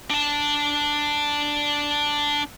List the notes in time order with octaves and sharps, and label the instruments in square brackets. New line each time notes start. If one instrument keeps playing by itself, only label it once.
[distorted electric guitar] D4 A5